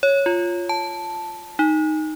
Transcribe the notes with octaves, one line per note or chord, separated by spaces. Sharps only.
C#5
F4
A5
D#4